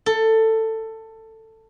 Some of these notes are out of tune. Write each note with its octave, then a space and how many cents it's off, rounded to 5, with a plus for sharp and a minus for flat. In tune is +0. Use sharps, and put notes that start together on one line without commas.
A4 +15